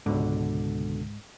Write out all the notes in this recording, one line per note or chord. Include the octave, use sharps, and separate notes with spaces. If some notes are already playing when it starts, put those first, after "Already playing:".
C#2 G#2 B2 D3